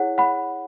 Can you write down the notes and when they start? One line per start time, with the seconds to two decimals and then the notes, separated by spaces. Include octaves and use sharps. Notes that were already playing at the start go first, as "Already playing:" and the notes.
Already playing: E4 G#4 C#5 F#5
0.18 F#5 B5